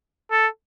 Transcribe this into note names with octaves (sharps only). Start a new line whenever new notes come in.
A4